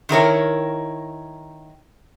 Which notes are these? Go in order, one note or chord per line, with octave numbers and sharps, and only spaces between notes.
D#3 E4 A#4 C#5